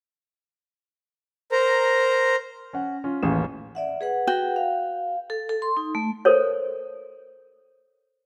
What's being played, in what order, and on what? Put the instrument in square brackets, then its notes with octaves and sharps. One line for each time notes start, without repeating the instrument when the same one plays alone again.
[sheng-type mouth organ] A#4 C5 A#5
[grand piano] C#4 F#5
C#4 F4
A1 D#2 E3 C#4 G#4 E7
[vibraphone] D5 E5 F#5
G#4 B4 F#5
[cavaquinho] F#4 G5
[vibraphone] F5
A4
A4
C6
D#4
A3
[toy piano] A4 A#4 C5 C#5